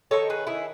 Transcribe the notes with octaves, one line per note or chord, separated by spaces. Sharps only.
D#3 G#3 D#4 A4 C#5
G#4 B4
E4 G#4